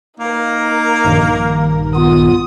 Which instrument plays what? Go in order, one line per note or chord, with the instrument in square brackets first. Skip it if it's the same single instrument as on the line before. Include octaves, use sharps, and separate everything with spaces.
[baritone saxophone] A#3 [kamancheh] D#4 A#4
[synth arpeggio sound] A#1 G2 D#3
[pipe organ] B3 F4 [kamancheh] D#6